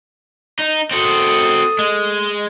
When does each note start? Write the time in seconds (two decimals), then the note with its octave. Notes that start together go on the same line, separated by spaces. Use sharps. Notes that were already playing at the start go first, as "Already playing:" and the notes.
0.59 D#4
0.91 C4 F#4 A4 D#6
1.79 G#3